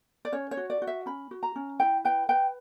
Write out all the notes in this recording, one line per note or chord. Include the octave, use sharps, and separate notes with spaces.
D5
C#4 C#5
C#5
F#4
D5
F#4
E5
C#4 B5
F#4
A#5
C#4
E4 G5
B4 G5
B4 G5